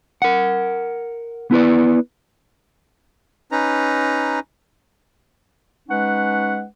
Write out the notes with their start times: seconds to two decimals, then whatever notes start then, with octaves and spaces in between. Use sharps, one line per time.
0.22 A#4 F#5
1.51 B3 E4 B4 D5
3.52 C#4 D#4 B4 A#5
5.89 G#3 C#4 D#4 B4 F#5